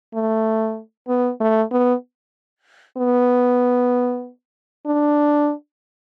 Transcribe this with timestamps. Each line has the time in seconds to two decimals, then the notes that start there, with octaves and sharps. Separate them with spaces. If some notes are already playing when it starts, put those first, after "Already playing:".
0.14 A3
1.08 B3
1.40 A3
1.72 B3
2.98 B3
4.86 D4